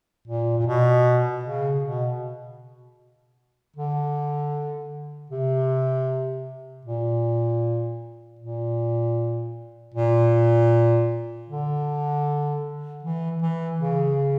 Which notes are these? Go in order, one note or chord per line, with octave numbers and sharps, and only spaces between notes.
A#2
A#2
B2
C#3
B2
D3
C3
A#2
A#2
A#2
D3
E3
E3
C#3